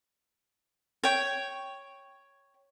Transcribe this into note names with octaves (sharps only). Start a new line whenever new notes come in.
C#5 G5